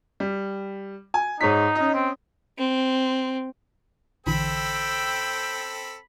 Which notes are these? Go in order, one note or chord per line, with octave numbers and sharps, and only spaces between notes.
G3
G#5
G#2 D#4 C#5 B6
C#4 D#5
C4
C4
A#1 D3 E3 C4 A4 G5 B5 E6